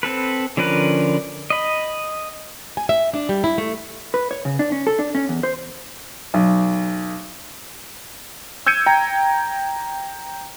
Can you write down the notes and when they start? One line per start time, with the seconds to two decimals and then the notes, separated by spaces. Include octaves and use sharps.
0.03 C4 A4 B4
0.57 D3 F3 C#4 A#4 B4
1.50 D#5 B5
2.77 G#5
2.89 E5
3.13 D4
3.29 G3
3.44 E4
3.58 A3
4.14 B4
4.31 C#5
4.45 C#3
4.59 D4
4.72 C#4
4.87 A4
4.99 D4
5.15 C#4
5.29 E2
5.43 C5
6.34 B1
8.66 E6 G6 G#6 C#7 D#7
8.86 G5 A#5